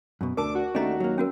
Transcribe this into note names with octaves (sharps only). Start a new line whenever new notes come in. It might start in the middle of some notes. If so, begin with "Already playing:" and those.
F#2 B2
D2 D4 A#4 A5 D6
F#4
D#2 A3 C#4 D4 D#5 A#5
F#3 A#3
C#4 F#4 A#4